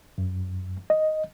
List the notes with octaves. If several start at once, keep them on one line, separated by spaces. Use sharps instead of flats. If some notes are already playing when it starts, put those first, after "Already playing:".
F#2
D#5